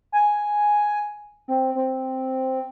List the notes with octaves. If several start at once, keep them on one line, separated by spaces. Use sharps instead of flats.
G#5
C4
C4